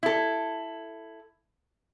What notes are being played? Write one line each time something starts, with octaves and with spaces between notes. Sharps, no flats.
E4 A4